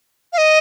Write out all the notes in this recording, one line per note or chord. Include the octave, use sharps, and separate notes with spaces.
F5
D#5